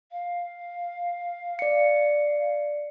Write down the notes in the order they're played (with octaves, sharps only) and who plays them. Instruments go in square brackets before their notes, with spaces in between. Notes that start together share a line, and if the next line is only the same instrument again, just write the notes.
[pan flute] F5
[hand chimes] D5 C#7